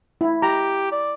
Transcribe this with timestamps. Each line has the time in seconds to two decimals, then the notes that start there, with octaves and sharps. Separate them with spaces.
0.21 E4
0.42 G4 A#5
0.92 D5